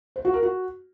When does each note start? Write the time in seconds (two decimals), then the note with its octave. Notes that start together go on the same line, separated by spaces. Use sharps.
0.16 C5
0.25 F#4
0.34 A#4
0.43 F#4